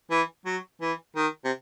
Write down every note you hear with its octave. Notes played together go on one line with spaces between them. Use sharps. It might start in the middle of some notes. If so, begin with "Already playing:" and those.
E3
F#3
E3
D#3
C3